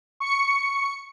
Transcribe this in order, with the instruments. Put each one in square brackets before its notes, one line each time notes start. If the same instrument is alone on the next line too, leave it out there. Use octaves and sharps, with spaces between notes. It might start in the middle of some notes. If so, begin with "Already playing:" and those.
[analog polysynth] C#6 C#7